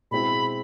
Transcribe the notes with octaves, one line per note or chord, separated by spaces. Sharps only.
B2 G#3 C4 E4 B5